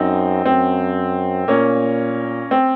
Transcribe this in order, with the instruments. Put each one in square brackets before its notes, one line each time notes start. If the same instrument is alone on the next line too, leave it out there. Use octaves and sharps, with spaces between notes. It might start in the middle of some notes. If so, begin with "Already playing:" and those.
Already playing: [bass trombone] F#2 [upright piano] C4 D#4
[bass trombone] F#2 [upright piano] C4
[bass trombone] A#2 [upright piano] A#3 C#4
[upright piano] C4